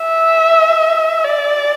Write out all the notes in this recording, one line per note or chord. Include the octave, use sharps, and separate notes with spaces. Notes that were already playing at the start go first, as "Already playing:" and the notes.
Already playing: E5
D5